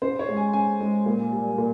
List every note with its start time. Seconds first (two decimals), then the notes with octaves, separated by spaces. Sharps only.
0.02 C#3 C5
0.19 C#5
0.28 G#3
0.37 G#5
0.53 C#3 G#5
0.80 G#3
1.06 A#2
1.32 G3
1.58 A#2